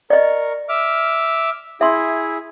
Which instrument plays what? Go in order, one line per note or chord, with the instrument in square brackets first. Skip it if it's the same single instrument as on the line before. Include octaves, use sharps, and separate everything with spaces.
[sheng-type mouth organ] A#4 C#6 [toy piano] D5 D#5
[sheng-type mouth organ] E5 D6 F6
[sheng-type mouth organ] E4 G#4 [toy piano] E5 C6